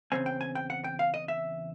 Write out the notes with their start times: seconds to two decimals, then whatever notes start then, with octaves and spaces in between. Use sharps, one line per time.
0.12 E2 C#3 F3 G#3 C4 G#5
0.26 G5
0.41 G#5
0.55 G5
0.70 F#5
0.84 G5
0.99 F5
1.14 D#5
1.28 E5